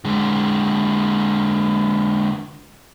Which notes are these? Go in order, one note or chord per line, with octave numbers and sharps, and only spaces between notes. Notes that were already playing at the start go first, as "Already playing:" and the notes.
D3 G#3